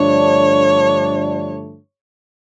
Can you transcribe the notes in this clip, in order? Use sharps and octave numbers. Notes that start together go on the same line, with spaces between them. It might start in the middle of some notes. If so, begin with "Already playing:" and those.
Already playing: G2 D3 F3 A3 D4 C#5